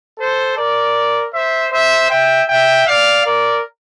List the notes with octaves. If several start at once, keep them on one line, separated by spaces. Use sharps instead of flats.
A4 C5
A#4 D5
C5 E5
C5 E5
E5 G5
E5 G5
D5 F5
A#4 D5